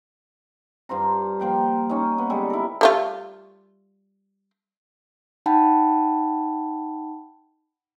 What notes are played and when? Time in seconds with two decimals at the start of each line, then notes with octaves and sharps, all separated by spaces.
0.89 G2 F4 C5 A#5
1.40 F3 A#3 G5 C6
1.89 C#4 D#4
2.18 B3
2.30 D3 G3 G#3 A4
2.50 E4 A#4
2.81 G3 A3 F4
5.46 D#4 F#5 G5 A5 B5